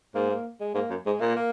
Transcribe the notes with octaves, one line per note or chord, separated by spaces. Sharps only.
G#2 A#3
A#3
G#3
G#2 A#3
F#2
G#2 G#3
A#2 A#3
A#3